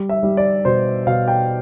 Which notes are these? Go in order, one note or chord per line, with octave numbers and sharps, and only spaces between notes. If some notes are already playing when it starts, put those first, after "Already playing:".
Already playing: G3
E5
G3
D5
B2 C5
B2 F5
G5